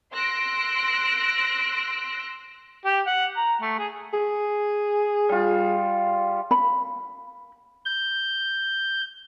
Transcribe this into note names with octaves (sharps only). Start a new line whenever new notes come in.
C6 E6 F#6 A#6 D7
G4
F#5
A#5
A3
G#4
G#4
G3 F4
B5
G6